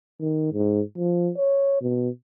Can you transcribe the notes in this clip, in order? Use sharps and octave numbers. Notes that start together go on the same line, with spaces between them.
D#3
G#2
F3
C#5
B2